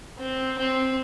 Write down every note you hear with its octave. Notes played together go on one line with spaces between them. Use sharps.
C4
C4